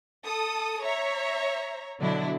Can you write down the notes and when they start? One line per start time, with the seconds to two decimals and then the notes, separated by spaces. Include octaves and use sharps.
0.25 A4 D#6
0.82 C#5 E5 A#5
1.99 B2 D3 F#3 D4 E4